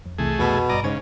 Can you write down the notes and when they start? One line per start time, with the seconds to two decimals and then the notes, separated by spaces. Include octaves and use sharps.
0.06 F2
0.19 C2 C3 E3 A3 G#4
0.39 F2 B2 F#4 B6
0.69 A1 G2 D5 D#5 A#5
0.84 G#2 C#3 C5 G#5 C#6